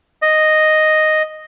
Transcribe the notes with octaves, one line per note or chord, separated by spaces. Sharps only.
D#5